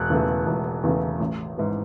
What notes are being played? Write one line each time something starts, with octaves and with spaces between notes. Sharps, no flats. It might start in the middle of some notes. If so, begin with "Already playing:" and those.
Already playing: E1 F#6
E2 C#3 E3 A3
E1
E2 C#3 E3 A3
A1
G#2 E3